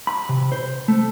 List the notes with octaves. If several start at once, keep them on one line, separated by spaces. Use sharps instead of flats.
B5
C3
C5
A3